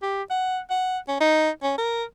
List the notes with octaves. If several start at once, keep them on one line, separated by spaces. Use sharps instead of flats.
G4
F#5
F#5
C#4
D#4
C#4
A#4